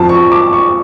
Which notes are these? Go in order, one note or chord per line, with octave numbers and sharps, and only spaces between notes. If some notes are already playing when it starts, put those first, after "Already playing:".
Already playing: F2 F3 A5
C#6
D6
C#6